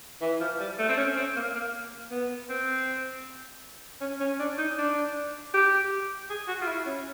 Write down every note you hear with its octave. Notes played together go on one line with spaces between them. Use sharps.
E3
F3
G3
A3
C4
C#4
C4
A#3
A#3
B3
C4
C#4
C#4
D4
D#4
D4
G4
G#4
F#4
F4
E4
C#4